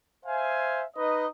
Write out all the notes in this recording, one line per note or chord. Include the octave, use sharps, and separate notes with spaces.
C5 E5 F5 G#5
D#4 B4 D#5